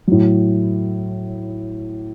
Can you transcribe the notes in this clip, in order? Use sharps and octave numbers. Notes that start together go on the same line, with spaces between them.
A2 F#3